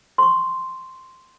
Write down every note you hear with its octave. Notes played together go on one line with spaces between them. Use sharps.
C6 C#6